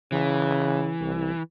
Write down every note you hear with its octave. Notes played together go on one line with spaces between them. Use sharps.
C#3 E3
C2